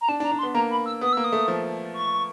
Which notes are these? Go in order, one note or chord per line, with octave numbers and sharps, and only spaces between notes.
A#5
D4 A5
D4
A#5
D4
C6
B3
A#3 A#5
B5
E6
B3 D#6
A#3 E6
D#6
A3
F3
C#6